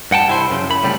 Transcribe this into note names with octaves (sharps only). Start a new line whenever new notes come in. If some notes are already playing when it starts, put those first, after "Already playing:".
G2 F#5 G5 A5
C2 E4 C5
F#2 C#3
F#2 B5
C2 A2 C#3 G3